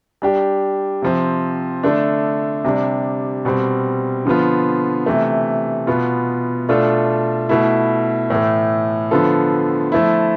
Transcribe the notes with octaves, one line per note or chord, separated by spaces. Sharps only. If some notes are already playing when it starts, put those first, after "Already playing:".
G3 D4 G4
C3 F3 C4
D3 A3 D4
C3 G3 D4
B2 G3 C4
D3 F3 B3 F4
C3 E3 A3
B2 B3 F4
B2 A3 D4 F4 A4
B2 A3 E4
A2 E3 A3
D3 F3 B3 F4 A4
F3 A3 E4